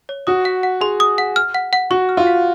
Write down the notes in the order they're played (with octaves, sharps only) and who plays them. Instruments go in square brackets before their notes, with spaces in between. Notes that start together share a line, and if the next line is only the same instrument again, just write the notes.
[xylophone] C#5
[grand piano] F#4 [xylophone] D#6
[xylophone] F#5
F#5
[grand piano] G#4 [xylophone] C6
[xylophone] D#6
F#5
F6
F#5
F#5
[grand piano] F#4 [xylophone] C#6
[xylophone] F6
[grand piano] F4
[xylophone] F#5